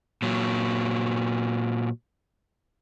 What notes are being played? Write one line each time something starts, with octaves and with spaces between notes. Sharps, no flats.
A#2 F#3